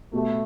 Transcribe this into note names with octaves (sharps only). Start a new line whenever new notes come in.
B2 A3 B3 G4